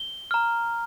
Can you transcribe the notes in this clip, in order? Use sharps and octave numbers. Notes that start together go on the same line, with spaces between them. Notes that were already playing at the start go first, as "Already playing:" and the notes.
Already playing: G7
A#5 F6